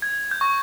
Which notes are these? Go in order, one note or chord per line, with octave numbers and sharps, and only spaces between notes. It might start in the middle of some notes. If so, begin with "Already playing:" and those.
G#6
G6
C#6